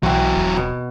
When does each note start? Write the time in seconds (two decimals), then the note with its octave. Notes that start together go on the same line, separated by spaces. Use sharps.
0.03 B1 E3 F#3 C4 F#4
0.36 D#1
0.57 B2